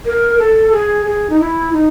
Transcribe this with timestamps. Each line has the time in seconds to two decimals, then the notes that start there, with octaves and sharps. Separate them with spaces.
0.05 A#4
0.39 A4
0.72 G#4
1.06 G#4
1.30 D#4
1.40 E4
1.73 D#4